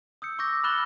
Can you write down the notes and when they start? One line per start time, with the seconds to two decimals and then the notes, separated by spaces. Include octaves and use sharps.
0.22 D#6 E6 G6 C#7
0.39 C#6 D6 E6 G6 A#6
0.64 B5 F6 F#6 A6 E7 G7